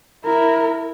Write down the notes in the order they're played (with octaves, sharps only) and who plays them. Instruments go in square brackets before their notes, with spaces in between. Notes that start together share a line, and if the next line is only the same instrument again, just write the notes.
[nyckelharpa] E4 [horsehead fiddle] A#4